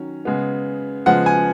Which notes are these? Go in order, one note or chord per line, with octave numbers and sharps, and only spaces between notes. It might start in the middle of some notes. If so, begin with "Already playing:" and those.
Already playing: D#3 F#3 C#4
C#3 G#3 B3
C#3 F3 G#3 B3 F#5
G#5